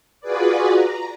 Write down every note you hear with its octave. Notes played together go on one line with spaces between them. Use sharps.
F4 F#4 G#4 B4 D5
A#5